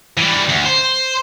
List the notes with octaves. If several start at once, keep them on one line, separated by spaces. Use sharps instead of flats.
E3 G3
D2
C5